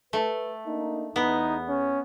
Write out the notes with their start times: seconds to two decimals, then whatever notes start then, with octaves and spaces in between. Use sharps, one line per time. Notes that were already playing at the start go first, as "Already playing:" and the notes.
0.13 A3 B4
0.66 A#3 D4 D#4
1.16 E2 B3 D#4
1.68 C#4